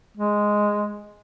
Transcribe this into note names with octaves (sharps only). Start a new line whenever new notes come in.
G#3